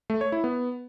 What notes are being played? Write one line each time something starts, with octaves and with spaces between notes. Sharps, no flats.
A3
C#5
E4
B3